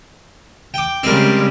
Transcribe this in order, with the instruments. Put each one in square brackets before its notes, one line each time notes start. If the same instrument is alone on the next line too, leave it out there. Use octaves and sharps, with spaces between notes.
[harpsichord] G5 D6
[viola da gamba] C#3 G3 G#3 [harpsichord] C4 A#4